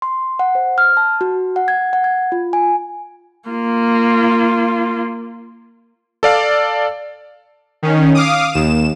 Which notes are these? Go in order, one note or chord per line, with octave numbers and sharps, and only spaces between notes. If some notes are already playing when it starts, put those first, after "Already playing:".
C6
F#5
C5
F6
A5
F#4
F#5
G#6
F#5
G#6
F4
G#5
A#3 F4
A4 D5 F5
D#3 C#4
F5 D6 D#6
D#2 E7